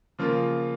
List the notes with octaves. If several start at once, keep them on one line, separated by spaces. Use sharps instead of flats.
C#3 F3 A#3 F4